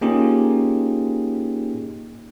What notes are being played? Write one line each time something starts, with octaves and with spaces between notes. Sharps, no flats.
A#3 C#4 D#4 F4 G4 G#4